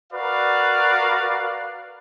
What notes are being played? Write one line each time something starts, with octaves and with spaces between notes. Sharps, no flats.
F#4 A#4 B4 D5 F5